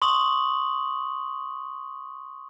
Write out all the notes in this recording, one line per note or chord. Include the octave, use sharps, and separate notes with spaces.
C6 C#6 D#6 F#7